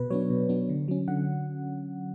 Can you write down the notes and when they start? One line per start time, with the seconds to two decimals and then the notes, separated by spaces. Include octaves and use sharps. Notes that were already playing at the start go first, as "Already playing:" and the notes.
Already playing: B2 B4
0.10 F#3 B3 D4 C#5
0.30 B2
0.49 F#3 B3 D4
0.69 D3
0.88 F#3 C#4
1.08 D3 F#5